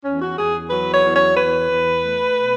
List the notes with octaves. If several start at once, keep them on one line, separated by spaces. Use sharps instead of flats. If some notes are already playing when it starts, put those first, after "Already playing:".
E2 C#4
F#4
E2 G#4
F#3 B4
C#5
E2
C#5
E2 B4
E2
A3
B2